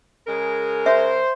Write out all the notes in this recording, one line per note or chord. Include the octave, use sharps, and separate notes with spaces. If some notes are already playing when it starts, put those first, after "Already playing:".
C#3 G#3 A#4
C5 E5